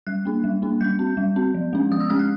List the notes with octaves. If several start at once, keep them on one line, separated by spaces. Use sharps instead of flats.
G3 F#6
A#3 D4
G3
A#3 D4
G3 G6
C4
G3
C4
F3
G#3 C#4
F3 D#6
E6
G#3 C#4 F6
F#6